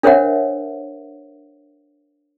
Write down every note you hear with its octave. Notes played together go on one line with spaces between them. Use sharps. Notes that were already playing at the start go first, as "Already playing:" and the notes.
D4 A#4 C5 C#5 E5 F#5